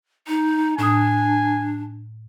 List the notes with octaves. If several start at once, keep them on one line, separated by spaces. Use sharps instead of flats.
D#4
A2 D4 G#5 D#6